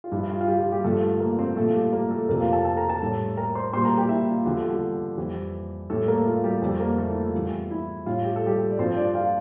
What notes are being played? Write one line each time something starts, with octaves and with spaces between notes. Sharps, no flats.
F4
G2 F3 E4
F4
F4
G3 G4
F4
G3 G4
G2 D3 F3 A3 A4
A#3 A#4
C4 C5
A#2 F3 A3 A4
F4
G3 G4
A#3 A#4
A3 A4
F2 C3 F3 A#3 A#4
F4 F5
A4 A5
A4 A5
A#4 A#5
A4 A5
A2 G3
A#4 A#5
C5 C6
A#2 G3 C5 C6
A#4 A#5
G4 G5
E4 E5
F4
E2 D3 F3 G4
A4
G3 G4
F2 E3 G3
A2 G3 A3 A4
A#3 A#4
F4
G3 G4
F2 D3 G3
A#3 A#4
A3 A4
E4
F4
E2 E3 G3
E4
A2 G3 F4
G4
A4
G3 G4
D5
G2 F3 C4 C5
D4 D5
F4 F5